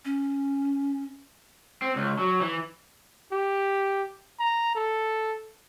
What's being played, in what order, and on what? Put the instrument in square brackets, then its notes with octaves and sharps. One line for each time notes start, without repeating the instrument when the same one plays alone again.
[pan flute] C#4
[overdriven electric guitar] C4
C#2
F#3
E3
[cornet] G4
A#5
A4